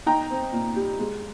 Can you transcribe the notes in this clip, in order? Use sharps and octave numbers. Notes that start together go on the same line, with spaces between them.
D#4 G5 A#5
C4
A#2
G3
G#3